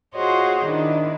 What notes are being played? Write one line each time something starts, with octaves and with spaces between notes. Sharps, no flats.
F4 F#4 G#4 C5 C#5 D#5
D#3 D4 E4